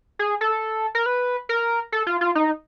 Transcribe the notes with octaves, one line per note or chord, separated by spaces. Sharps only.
G#4
A4
A#4
B4
A#4
A4
F4
F4
D#4